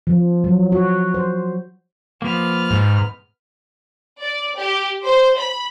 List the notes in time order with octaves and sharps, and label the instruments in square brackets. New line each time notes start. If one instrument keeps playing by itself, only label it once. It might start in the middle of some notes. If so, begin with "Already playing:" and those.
[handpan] F3
F#3
F#4
C5
[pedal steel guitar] F3 A#3 [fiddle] B3 F6
[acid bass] G#2
[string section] D5
G4
C5
B5